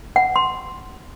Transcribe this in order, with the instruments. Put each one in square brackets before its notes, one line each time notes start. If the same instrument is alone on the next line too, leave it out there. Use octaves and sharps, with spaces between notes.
[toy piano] F#5
C6